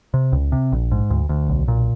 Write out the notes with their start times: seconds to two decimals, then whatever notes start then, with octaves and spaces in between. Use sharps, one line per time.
0.14 C3
0.32 C#2
0.52 C3
0.72 A#1
0.92 G#2
1.10 D2
1.29 D2
1.49 B1
1.68 A#2